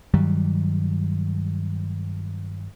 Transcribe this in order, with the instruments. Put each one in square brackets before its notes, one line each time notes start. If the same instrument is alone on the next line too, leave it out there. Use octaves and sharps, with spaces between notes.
[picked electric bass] G2 D#3 F#3 G3